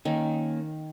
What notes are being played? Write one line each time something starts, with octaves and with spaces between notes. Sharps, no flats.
D#3 A#3 C#4